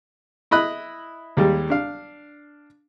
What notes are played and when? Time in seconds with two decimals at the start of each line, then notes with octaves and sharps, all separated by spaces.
0.51 E4 D#5 B5 F#6
1.37 D#2 G3 G#3
1.70 D4 F5